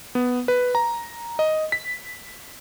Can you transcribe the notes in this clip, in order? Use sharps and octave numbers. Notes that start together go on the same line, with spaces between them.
B3
B4
A#5
D#5
B6